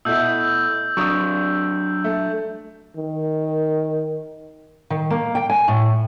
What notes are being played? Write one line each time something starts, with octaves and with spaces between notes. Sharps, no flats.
B2 A3 E4 E6 G6
F#3 D4 C#6 D#6
A3
D#3
D#3
A#3
G5
G#5
A2